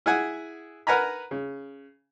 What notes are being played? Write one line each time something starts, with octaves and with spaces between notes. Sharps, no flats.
E4 G#4 F#5 G#5
A#4 B4 F#5 G#5 A#5 B5
C#3